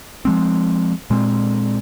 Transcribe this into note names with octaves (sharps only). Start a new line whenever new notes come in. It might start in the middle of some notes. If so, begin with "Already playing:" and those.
F3 G#3 C4
A#2 G#3 C4